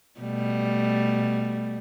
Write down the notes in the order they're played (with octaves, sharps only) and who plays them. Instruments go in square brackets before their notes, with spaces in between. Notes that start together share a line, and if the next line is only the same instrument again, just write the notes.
[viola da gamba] B2 G3 A3